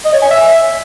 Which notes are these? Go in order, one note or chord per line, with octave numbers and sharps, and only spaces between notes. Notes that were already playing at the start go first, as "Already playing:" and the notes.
D#5
C#5
G#5
E5